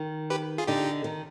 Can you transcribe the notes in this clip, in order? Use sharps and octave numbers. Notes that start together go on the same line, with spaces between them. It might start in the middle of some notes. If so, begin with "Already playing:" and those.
Already playing: D#3
G4 B4
F4 G#4
D3 D#4 G4
D#3